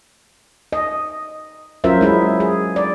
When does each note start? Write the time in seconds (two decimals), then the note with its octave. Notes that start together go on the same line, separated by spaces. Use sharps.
0.73 D#5
1.84 F#3 C#4 F4 A#4 C5 E5
2.01 G#3 E4 G#4
2.40 G#4
2.76 D5